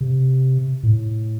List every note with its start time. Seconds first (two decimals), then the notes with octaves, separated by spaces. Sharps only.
0.01 C3
0.83 A2